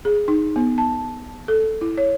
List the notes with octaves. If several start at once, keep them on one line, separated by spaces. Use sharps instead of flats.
G#4
D#4
B3
A5
A4
E4
C#5